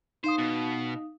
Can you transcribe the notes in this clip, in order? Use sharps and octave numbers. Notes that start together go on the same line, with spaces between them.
D#4 C5 F5 D#6
B2